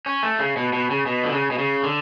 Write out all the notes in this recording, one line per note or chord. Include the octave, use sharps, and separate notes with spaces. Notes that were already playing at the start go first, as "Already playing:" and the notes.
C#4
A3
C#3
B2
B2
C#3
B2
D3
C#3
B2
C#3
D3